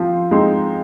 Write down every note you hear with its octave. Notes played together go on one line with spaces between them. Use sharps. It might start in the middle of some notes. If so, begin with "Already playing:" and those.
Already playing: F3 C4
G#3 C4 D#4